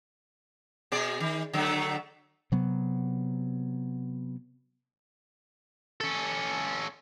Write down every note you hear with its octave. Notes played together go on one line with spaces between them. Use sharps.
B2 G#4 D5
D#3
D3 F#3 A3
C3 F#3 B3
C#4 A4